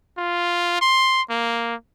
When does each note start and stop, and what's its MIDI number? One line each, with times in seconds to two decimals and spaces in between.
0.18 0.79 65
0.81 1.22 84
1.30 1.75 58